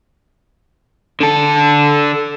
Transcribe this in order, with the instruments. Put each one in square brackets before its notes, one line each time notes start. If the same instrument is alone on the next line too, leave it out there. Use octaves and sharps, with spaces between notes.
[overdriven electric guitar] D3 A4